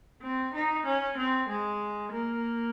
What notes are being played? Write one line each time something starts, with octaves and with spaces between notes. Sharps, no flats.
C4
D#4
C#4
C4
G#3
A#3